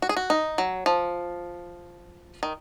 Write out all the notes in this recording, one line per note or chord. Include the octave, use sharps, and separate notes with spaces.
F#4
G#4
F#4
D#4
F#3
F3
D#3